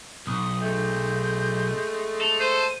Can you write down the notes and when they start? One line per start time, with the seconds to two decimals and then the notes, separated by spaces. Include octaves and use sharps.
0.27 B1 D#6
0.61 G#3 A3 G6
2.21 A4 F7
2.40 C5 D#7